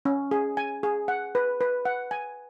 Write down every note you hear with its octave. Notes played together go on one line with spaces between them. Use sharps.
C#4
G#4
G#5
G#4
F#5
B4
B4
F#5
G#5